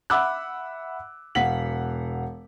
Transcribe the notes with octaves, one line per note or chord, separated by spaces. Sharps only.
E5 F#5 B5 D6 E6 F#6
E1 F5 F#5 B6 F#7